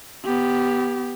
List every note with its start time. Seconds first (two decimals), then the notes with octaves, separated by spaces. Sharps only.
0.25 B3 G4